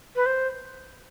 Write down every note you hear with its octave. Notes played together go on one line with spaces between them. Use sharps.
B4
C5